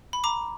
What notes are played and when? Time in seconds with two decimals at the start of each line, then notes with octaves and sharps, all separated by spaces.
0.13 B5
0.24 A#5 D6